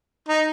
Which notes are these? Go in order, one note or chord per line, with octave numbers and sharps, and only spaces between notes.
D#4